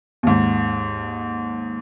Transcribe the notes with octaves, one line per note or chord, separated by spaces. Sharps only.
D#2 G#2